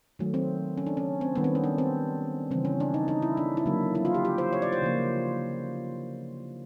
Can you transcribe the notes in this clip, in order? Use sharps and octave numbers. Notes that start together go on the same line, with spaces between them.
D#3 F#3 A3
C4
C#4
D4
C#4
C4
D#3 G3 B3
C4
C#4
D4
C4
C#3 E3 G3 C4
C#4
D4
D#4
D#4
E4
D4
E4
D3 F#3 A#3
E4
F4
G4
G4
C5
C#5
D5
C5
C#3 F3 A#3